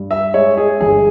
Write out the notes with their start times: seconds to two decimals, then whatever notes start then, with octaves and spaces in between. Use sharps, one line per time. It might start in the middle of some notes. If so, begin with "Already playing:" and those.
Already playing: G2
0.11 E5
0.34 G#3 C#5
0.57 G#4
0.81 G1 G#4